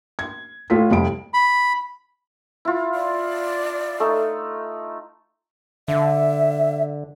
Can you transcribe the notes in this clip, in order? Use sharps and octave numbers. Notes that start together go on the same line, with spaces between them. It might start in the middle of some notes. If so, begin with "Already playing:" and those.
G#6
A2 F4 A4 B6
F1 C2 F2 D7
B5
E4 F4
D5
A3 D#4 A4
D3 E5